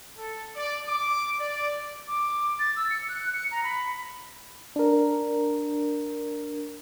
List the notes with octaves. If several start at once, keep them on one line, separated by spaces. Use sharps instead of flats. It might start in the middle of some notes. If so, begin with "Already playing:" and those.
A4
D5
D6
D5
D6
A6
E6
C#7
F#6
C#7
A#5
B5
D4 A#4